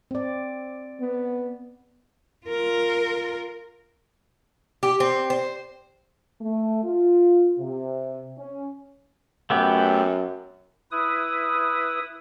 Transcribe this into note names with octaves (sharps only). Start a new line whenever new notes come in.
C4 D5
B3
F4 A#4
G4
C4
C5
A3
F4
C3
C#4
F#2 A3 B3 G4
E4 B4 D#6